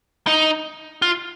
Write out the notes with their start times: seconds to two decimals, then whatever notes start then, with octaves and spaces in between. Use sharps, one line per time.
0.27 D#4
1.02 F4